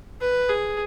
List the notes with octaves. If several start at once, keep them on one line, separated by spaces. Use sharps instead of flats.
B4
G#4